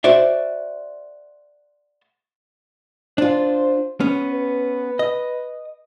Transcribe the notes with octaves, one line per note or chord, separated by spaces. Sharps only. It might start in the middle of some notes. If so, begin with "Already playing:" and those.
F#4 C5 D5 E5
D4 F4 C5
B3 C#4
B4
D#5